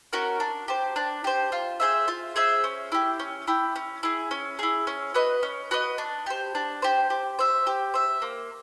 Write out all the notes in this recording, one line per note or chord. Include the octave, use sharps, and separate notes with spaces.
C#4 F#4 A#4
D4
G4 C5
D4
G4 C5
F4
G#4 C5 E5
F4
G#4 C5 E5
C#4
E4 G4
C#4
E4 G4
C#4
E4 G#4
C#4
E4 G#4
C#4
F#4 B4 D#5
C#4
F#4 B4 D#5
D4
G4 C5
D4
G4 C5
G4
C5 E5
G4
C5 E5
A#3